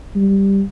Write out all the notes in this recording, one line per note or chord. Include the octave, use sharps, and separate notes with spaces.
G3